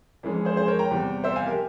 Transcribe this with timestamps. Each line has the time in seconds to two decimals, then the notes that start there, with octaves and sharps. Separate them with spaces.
0.23 F2 E3 G#3 C#4
0.45 G#4 C5
0.56 G#4 C5
0.68 A#4 C#5
0.79 G5 A#5
0.91 E2 C3 G3
1.24 C5 E5
1.36 F5 G#5
1.46 G4 A#4